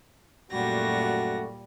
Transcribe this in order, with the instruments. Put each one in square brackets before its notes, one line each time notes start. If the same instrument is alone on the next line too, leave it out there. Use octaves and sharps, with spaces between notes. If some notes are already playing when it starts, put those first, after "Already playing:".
[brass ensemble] F#2 A3 F#4 [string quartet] A#2 G3 A#6